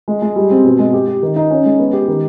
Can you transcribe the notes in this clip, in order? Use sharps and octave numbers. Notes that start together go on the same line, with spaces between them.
G#3
G#3
G3
C4
B2
G#3
G4
G4
D#3
D#4
C#4
G#3
B3
G4
D#3